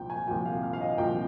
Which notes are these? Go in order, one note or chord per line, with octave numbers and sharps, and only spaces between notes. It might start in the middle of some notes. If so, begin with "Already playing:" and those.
Already playing: C2 A#2 F3 G5
G#5
C2 A#2 F3 G5
F5
F5
F5
D#5
C2 A#2 F3 G5